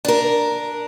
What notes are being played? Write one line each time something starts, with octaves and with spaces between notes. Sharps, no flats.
D4 A#4